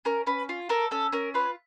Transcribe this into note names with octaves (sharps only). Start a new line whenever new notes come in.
C#4 A#4
C#4 B4
F4
A4 A#4
C#4 A4
C#4 A#4
F4 B4